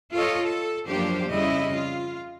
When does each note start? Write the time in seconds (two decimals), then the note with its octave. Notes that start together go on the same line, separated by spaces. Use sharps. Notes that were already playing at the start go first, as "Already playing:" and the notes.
0.13 F4 A4 C#5 D#5
0.43 A4
0.87 F#2 F3 A#3 D4 G4 C5
1.29 F2 C#3 G3 E4 D#5
1.73 F4